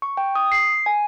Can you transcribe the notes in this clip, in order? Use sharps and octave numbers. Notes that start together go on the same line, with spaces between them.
C#6
G5
D#6
C7
G#5